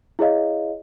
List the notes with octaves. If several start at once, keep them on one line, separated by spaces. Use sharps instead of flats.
E4 G#4 C#5 D#5 F5